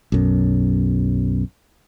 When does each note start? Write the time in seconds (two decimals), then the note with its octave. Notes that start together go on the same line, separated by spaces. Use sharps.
0.12 B1 F#2